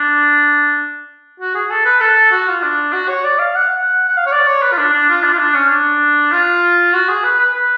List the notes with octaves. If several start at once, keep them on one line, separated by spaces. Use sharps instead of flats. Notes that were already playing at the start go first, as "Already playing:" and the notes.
Already playing: D4
F#4
G#4
A4
B4
A4
F#4
F4
D4
F#4
C#5
D5
F5
F#5
F#5
F#5
F5
C#5
D5
C#5
B4
F4
D4
D4
F4
D4
F4
D4
C#4
D4
F4
F#4
G#4
B4
B4
B4